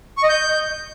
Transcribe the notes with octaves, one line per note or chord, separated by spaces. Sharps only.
C#6
D#5
G6